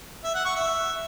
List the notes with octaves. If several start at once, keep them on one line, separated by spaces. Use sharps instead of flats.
E5
F#5
C#6
E5